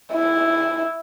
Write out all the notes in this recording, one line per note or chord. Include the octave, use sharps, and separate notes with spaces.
E4